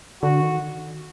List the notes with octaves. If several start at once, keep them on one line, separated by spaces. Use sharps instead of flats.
D3 F#4
D#3